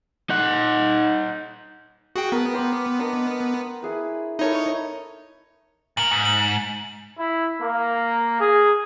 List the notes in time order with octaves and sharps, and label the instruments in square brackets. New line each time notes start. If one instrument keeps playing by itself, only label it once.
[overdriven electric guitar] D#4 F#5
[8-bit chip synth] F#4 G5 [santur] G#4
[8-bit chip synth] B3 [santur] A#4 A5
[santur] G5 C6 D6
D4 A#4 D#5
E4 G#4 B4
[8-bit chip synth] D#4 C#5 [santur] E4 A4 A#4
[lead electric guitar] A#2 A#4 [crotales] F#7
[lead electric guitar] G#2
[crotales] F#7
[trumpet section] E4
A#3
G#4